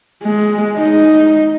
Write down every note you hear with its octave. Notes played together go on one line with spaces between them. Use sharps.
G#3
D#4